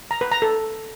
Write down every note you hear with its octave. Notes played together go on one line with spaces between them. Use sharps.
A#5
B4
A#5
A4